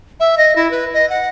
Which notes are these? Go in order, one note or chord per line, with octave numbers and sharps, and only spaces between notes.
E5
D#5
E4
B4
D#5
F#5